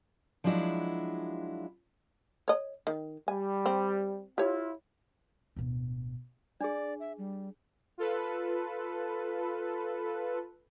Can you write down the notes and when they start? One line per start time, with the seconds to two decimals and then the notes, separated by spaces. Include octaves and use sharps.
0.44 F3 F#3 G#3 D4 E4 F#4
2.48 C#5 D#5
2.87 D#3
3.28 G3 G#5
3.66 C4
4.38 E4 F4 G4 C#5
5.56 D1 B2
6.61 D4 G#4 D5
7.00 E5
7.18 G3
7.98 F4 A4 B4